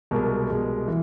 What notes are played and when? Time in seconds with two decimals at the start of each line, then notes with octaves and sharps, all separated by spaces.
0.11 C2 B2 G#3 A#4
0.50 C2 B2 G#3
0.88 E3